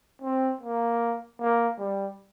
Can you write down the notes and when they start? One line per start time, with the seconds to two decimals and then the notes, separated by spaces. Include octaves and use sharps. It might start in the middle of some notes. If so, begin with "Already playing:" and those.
0.22 C4
0.61 A#3
1.40 A#3
1.79 G3